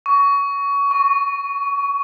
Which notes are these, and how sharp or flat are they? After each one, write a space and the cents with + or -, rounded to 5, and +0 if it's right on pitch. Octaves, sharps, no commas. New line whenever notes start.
C#6 +25
C#6 -5